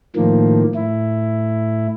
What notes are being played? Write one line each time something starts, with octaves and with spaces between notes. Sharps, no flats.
A2 D#3 F3 A#3
A2 E4